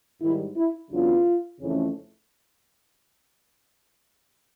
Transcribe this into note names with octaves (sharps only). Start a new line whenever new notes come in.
G#2 D#3 G3 E4
E4
E2 C#3 F#3 B3 D4 F4
F2 C#3 E3 A3 C#4